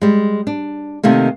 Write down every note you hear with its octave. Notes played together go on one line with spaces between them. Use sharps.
G3 G#3
D4
C3 D#3 A3 A#3